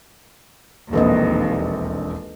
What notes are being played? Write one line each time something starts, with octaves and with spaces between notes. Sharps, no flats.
E1 A#1 D#2 C4 A4 B4 D#5